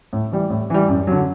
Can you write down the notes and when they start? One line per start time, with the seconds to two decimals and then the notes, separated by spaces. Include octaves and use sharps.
0.13 A2
0.32 E3 G3
0.50 A2
0.70 E3 G3
0.88 F#2
1.07 D3 F#3